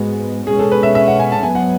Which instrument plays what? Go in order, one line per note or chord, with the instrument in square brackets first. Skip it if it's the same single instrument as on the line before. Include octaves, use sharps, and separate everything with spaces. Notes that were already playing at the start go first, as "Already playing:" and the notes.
Already playing: [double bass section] G#2 G#3 B3 [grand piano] F#4
[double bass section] B2 G#3 C#4 [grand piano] G#4
[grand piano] A4
B4
E5
E5
F#5
G#5
A5
[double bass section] G#2 F#3 B3 [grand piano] G#5
[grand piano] F#5